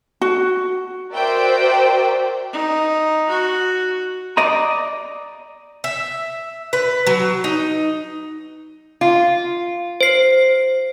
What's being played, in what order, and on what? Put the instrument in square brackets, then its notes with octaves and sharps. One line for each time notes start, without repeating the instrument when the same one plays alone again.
[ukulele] F#4
[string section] F#4 A#4 C5 D5 E5 G5
[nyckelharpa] D#4
F#4
[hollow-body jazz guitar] D5 D#5 A#5
[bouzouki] E5
B4
F#3
D#4
[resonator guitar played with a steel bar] F4
[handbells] C5 C7